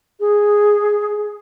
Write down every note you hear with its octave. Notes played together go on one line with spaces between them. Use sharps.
G#4